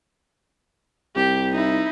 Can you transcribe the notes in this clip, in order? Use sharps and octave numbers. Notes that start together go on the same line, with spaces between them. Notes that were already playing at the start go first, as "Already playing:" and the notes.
C2 G4
D#4 E4